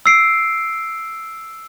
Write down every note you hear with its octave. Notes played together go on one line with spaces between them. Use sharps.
E6 C7 D7